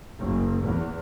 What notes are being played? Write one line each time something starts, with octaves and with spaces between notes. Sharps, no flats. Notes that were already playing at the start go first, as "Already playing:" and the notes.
F#1
E2